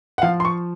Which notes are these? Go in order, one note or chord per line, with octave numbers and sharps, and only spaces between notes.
F#5
F3 F5
C6
C#6